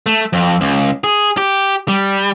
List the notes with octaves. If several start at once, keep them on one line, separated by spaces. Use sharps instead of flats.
A3
F2
C#2
G#4
G4
G3